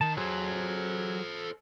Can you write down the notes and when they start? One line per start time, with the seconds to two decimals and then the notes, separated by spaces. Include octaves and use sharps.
0.01 D#3 A5
0.17 F#3 G#4 A4 C5